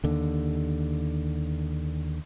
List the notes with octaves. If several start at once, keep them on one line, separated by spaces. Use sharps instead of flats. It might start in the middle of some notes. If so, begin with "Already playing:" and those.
D#2 D3